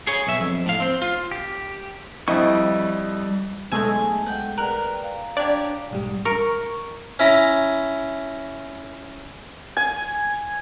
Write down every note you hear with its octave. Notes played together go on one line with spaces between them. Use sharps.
G#4 C#5
B1 E5
F2
A2 F5
C4 C5
F4
G4
F2 G3 E4 D#5 C#6
B1 G#3 A3 G#5 A5 E6
F#5 G5
A#4 B4 D5 G5 F#6
F5 A#5
D4 G4 C#5 D5
B1 G#2 G3
A#4 C#6
C#4 E4 A#5
G#5